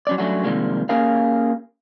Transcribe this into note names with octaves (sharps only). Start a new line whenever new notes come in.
F#3 C#4 D5
F#3 G3 A3 C#4 D4 F#4
C3 D#3 F3 G3 G#3 A#3
A#3 C#4 G4 G#4 A#4 F5